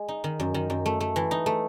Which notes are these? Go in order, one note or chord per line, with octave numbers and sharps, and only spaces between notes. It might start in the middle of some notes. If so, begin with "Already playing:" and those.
Already playing: G#3
D#4
D#3
F#2
D#3
F#2
A3
A3
E3
D#4
A3